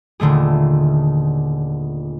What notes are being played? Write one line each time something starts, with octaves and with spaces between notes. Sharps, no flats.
D#1 D3 A3 G#4